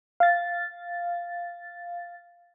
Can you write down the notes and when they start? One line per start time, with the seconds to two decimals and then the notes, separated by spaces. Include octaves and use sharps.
0.20 F5 A6